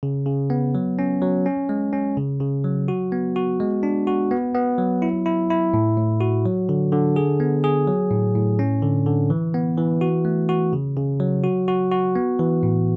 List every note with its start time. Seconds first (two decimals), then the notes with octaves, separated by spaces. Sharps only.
0.03 C#3
0.26 C#3
0.50 B3
0.75 F#3
0.99 C#4
1.22 F#3
1.46 C#4
1.69 G#3
1.93 C#4
2.17 C#3
2.41 C#3
2.64 F#3
2.88 F#4
3.12 B3
3.36 F#4
3.60 G#3
3.83 D4
4.07 F#4
4.31 B3
4.55 B3
4.78 F#3
5.02 E4
5.26 E4
5.50 E4
5.74 A2
5.97 A2
6.21 F#4
6.45 F#3
6.69 D3
6.92 D3
7.16 G#4
7.40 B3
7.64 G#4
7.87 F#3
8.11 A2
8.35 A2
8.59 C#4
8.83 D3
9.06 D3
9.30 E3
9.54 B3
9.78 E3
10.01 F#4
10.25 A3
10.49 F#4
10.73 C#3
10.97 C#3
11.20 F#3
11.44 F#4
11.68 F#4
11.92 F#4
12.16 B3
12.39 E3
12.63 A2